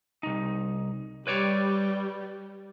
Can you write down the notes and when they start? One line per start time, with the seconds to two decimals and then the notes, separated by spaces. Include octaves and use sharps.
0.23 C2 D#4
1.27 G3 B4 C#5 D5